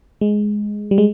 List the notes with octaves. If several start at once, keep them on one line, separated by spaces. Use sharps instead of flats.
G#3
G3
G#3